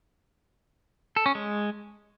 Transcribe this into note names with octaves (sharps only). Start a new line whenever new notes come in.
A4
C#4
G#3